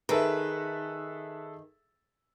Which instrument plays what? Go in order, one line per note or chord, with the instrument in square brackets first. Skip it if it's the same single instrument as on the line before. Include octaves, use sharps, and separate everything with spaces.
[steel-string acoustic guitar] D#3 [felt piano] G#4 A4 E5 [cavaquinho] B4